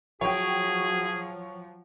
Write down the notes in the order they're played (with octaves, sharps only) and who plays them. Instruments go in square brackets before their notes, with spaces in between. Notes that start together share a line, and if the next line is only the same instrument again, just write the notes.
[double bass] F3 F#3 [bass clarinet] F#4 [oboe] G#4 [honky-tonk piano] C#5 G5